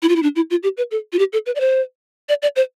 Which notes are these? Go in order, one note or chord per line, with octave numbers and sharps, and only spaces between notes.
E4
F4
E4
D4
E4
F4
G4
B4
A4
F4
G4
A4
B4
D5
C5
D5
D5
C5